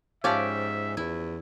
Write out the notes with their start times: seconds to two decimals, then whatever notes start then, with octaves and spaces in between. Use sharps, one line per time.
0.24 G#2 F3 C#4 G4 D5 E5
0.97 E2 E4